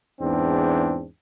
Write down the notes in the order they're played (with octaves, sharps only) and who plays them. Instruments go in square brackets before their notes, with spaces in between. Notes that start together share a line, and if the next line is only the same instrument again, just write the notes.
[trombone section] E2 G#2 C4 D4